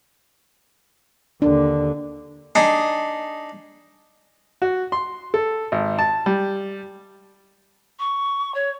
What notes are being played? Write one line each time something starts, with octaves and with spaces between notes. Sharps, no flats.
D#2 D3 D4
D4 D#4 G#4
F#4
C6
A4
G#1
A5
G3
C#6
C#5